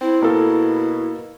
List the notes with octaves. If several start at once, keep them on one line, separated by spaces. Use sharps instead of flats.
C4 E4
B2 A#3 A4